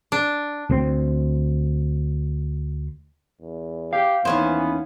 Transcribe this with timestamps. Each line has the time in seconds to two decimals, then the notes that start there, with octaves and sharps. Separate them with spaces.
0.12 D4
0.70 D2 C4
3.41 E2
3.93 G4 F5
4.25 D#2 E3 B3 C#4 C5